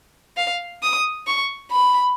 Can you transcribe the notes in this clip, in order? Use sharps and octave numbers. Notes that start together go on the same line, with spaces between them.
F5
D#6
C#6
B5